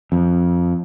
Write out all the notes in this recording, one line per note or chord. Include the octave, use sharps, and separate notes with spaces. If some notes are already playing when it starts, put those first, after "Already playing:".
F2